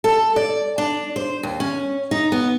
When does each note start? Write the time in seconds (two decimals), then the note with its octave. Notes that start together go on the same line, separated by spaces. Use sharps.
0.04 A4
0.36 D5
0.78 D4
1.16 C5
1.43 D#2
1.60 C#4
2.11 D#4
2.32 B3